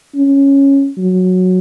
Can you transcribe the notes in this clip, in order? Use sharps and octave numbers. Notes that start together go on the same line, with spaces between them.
C#4
F#3